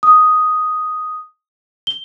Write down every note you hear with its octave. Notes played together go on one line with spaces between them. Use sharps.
D#6
G7